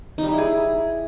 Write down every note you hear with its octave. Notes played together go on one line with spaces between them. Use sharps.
D#4
G3
D#4
E4
G#4